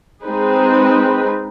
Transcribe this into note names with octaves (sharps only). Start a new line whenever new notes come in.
G#3 C4 D#4 G#4 B4